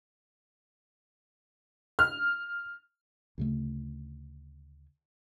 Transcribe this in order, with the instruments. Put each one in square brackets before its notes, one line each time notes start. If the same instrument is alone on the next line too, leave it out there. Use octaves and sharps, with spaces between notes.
[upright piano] F6
[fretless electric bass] D2 C#3 A3